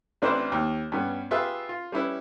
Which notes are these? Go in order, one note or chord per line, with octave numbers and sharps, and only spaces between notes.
A1 C4 D4 E4 B4 C5
D#2
G2 B3 C#4
F4 G4 G#4 B4 E5
F4
G3 C#4 E4 B4